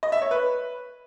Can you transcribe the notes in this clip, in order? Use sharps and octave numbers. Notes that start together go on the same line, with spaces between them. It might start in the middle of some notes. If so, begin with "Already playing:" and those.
D#5
E5
C#5
B4